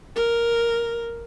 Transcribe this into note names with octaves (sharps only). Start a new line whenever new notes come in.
A#4